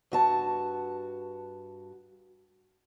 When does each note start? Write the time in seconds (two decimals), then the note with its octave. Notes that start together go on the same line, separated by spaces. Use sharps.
0.12 G2 F#4 A5